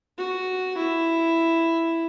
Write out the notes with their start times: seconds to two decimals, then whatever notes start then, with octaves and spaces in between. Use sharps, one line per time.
0.18 F#4
0.77 E4